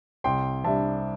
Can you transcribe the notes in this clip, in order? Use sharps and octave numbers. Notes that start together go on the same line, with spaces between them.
C2 G5 C6
C3 G3 D4 E5 A5